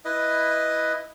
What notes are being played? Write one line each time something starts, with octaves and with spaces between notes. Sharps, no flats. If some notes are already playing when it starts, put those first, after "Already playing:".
E4 B4 D#5